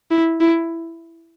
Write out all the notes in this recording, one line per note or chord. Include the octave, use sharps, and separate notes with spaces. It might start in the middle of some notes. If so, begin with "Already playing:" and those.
E4
E4